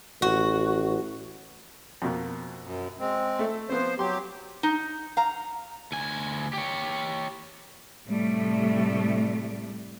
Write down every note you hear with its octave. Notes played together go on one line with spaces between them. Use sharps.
A1 F#4
F2 B2 A#3
F#2
G#3 C4
A3 A4
F3 B3 C4 C5
F#3 G4 C6
D#4
F5 A#5
D2 G#5
G4 C#5
A2 C3 G3 A3